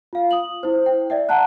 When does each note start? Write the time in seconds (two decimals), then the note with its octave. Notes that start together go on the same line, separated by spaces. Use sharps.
0.13 F4 F5
0.31 D#6 F#7
0.63 E4 C5
0.86 G5
1.10 D5 E5 G5
1.29 F#5 A5 A#5 F#6